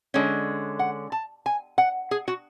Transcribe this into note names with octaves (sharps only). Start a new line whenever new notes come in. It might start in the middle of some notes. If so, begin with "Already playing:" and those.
D3 G#3 C#4
F#5
A5
G#5
F#5
G#4
F#4